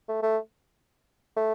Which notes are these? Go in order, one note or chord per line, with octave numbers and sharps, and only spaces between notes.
A3
A3
A3